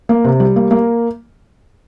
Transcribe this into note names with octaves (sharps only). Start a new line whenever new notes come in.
A#3
C3
G3
A#3
A#3